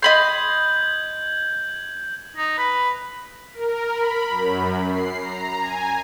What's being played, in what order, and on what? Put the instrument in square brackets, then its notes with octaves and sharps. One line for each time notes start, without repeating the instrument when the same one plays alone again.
[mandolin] D#5 B5 C6 [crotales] G6 G#6 F#7
[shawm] D#4
B4
[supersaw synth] A#4
B5
F#2
C7
A#5
G#5